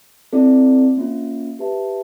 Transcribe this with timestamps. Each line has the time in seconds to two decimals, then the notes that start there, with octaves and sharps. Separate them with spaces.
0.33 C4 E4 A4 D5
0.97 A#3 C#4 F4
1.59 G4 B4 E5 A5